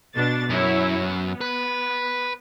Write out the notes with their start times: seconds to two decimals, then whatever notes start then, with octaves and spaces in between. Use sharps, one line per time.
0.15 B2 D4 A6
0.50 F#2 E4 C#5
1.04 B3
1.41 B4